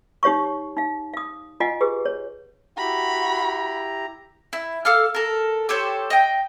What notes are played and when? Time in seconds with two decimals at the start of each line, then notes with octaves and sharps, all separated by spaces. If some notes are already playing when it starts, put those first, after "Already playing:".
0.23 D#4 G4 C#5 F5 C#6
0.77 D#4 F5
1.14 F5 D#6
1.60 F4 D#5 F#5 G#5
1.81 G4 G#4 B4
2.05 C#5
2.78 E4 F#4 G4 A#5 B5
4.53 E4
4.85 A4 F5 D6 F6
5.14 A4 A#4
5.69 G4 A4 C5 C#5
6.10 D#5 G5